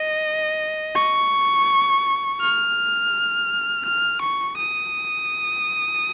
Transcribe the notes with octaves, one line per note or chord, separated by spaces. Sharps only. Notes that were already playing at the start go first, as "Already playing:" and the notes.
Already playing: D#5
C#6
F6
F6
C#6
D#6